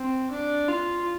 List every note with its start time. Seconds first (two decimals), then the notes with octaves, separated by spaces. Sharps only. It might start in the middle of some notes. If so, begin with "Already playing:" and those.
Already playing: C4
0.31 D4
0.68 F4